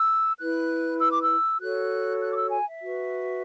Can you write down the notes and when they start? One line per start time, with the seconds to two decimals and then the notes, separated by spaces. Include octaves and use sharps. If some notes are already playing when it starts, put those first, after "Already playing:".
Already playing: E6
0.39 E4 B4 F#6
1.00 E6
1.12 D6
1.23 E6
1.60 F#4 A4 C#5 F#6
2.21 F#6
2.32 D6
2.36 E6
2.51 G#5
2.67 E5
2.82 F#4 B4